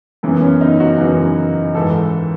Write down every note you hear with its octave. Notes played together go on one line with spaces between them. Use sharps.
F#2 C#3 E3 B3
C#4
D#4
F#4
F#2 C#3 E3
G#2 E3 A4